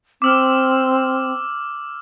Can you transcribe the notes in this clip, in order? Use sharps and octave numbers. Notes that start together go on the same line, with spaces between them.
C4 D6 E6 F6